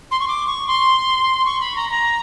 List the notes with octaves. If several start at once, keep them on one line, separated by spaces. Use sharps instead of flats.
C6
C#6
D6
C#6
C6
C#6
B5
A#5
A#5